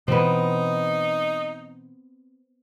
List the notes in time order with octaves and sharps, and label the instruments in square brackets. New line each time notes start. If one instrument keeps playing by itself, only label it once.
[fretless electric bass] B2 E3 [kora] B3 C4 [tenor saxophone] D#4